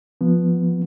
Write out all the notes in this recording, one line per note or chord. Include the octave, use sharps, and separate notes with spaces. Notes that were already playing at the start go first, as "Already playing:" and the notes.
F3 B3